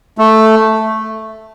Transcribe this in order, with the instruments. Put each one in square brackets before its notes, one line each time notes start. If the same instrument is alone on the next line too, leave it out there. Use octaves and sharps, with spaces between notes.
[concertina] A3